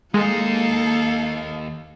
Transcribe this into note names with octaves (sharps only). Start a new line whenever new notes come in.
D#2 G#3 A#3 D#4 A4 F5